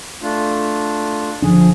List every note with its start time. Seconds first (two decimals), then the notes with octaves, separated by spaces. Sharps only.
0.22 A3 D4 F4
1.42 F#1 D3 F3 D4 G#4